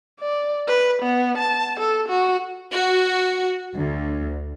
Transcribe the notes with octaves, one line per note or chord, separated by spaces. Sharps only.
D5
B4
B3
A5
A4
F#4
F#4
D2